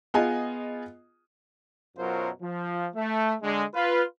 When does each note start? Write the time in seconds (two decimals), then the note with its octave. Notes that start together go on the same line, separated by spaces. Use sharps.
0.14 B3 F4 G#4 D#5 G#5
1.97 F#2 B2 F#3 F4 A#4 C5
2.42 F3
2.95 A3
3.42 D3 G#3
3.74 F4 B4